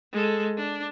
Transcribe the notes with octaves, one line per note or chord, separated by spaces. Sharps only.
G#3 A4
D4